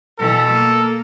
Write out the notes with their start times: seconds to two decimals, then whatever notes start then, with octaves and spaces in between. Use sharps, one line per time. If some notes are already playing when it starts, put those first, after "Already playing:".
0.19 B2 E3 A4
0.51 A#3